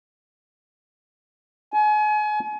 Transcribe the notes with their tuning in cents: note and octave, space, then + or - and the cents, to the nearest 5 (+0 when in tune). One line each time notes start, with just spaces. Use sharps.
G#5 +35